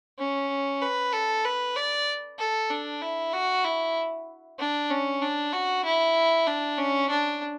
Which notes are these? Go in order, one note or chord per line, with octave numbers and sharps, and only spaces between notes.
C#4
B4
A4
B4
D5
A4
D4
E4
F#4
E4
D4
C#4
D4
F#4
E4
D4
C#4
D4